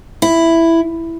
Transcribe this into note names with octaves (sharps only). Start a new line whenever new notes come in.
E4